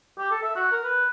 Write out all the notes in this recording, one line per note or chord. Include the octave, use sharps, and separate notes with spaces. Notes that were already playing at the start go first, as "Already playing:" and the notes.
G4
A4
E5
F#4
A#4
B4